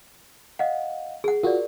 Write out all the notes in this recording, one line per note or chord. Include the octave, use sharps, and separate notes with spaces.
D#5 F5 F#5
G#4 F#5
F4 F#4 A#4 D5